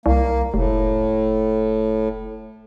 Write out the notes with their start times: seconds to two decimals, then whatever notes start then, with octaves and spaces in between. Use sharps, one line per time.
0.06 C2 A#3
0.54 F1 A2